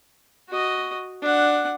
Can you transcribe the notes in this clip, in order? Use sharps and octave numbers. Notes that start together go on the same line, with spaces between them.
F#4 D#5
D4 F#5